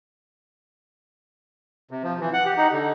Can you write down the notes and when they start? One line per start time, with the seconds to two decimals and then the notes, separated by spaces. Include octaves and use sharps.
1.91 C3
2.03 F3
2.21 E3
2.33 F#5
2.46 G4
2.57 D#4
2.73 D3